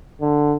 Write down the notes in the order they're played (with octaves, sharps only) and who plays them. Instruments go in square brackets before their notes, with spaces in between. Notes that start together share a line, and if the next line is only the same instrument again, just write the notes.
[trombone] D3